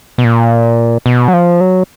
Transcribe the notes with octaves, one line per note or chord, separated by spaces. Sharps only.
B2
A#2
B2
F#3
F3
F#3